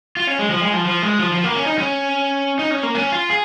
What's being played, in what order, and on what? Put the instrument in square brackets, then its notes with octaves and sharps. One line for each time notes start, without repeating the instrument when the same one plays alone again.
[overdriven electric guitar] F4
C#4
G#3
F3
G#3
F3
F3
G#3
F3
F3
A#3
C#4
D#4
C#4
D#4
C#4
A#3
C#4
F4
G#4